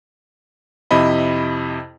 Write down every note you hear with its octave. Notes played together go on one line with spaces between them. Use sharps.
F2 C3 E4 D#5 B5